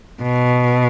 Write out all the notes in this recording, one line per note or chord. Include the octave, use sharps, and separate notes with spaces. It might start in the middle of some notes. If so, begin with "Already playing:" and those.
B2